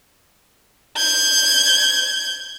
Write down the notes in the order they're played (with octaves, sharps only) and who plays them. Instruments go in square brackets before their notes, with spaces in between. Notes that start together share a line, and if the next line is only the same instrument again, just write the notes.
[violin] G6 G#6